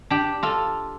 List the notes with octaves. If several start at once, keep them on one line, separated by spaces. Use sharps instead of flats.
D4 G4
F4 A4